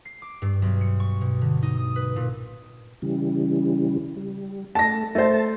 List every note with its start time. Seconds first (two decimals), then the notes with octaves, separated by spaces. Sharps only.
0.05 C7
0.22 D6
0.42 G2
0.62 B1
0.81 C#7
1.00 C#6
1.21 B2
1.41 D3
1.62 D#4
1.77 D#6
1.96 B4
2.16 A#2
3.02 C#3 E3 G3
4.17 G3
4.75 A3 A5 A#6
5.15 A3 C5 A5